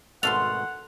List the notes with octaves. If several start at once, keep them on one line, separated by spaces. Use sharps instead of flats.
G#1 B2 A3 A4 F5 F#5 C6 F7